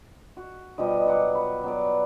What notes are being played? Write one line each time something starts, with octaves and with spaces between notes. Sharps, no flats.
F#4
B2 F3 G3 D#5
F#3 F#5 D6
B5
F#3 B3 D5